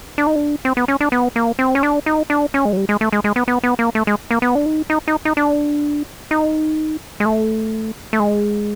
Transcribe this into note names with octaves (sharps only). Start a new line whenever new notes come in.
D4
D#4
D4
C4
B3
C#4
D4
B3
A#3
C4
C#4
D4
D#4
D4
C#4
G#3
F#3
G3
G#3
A3
G#3
G#3
B3
B3
B3
A#3
A3
G#3
A#3
B3
D4
D#4
D#4
D#4
D#4
D4
D#4
G#3
A3
A3
G#3